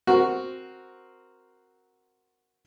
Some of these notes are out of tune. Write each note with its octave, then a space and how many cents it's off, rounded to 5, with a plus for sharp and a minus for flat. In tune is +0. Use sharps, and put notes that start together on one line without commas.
C4 +0 F#4 +0 A#4 +0